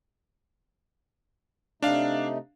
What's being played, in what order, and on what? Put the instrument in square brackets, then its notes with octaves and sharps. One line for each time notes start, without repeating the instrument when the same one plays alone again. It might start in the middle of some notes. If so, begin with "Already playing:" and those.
[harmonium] C3 A3 D#4 [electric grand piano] D4 F5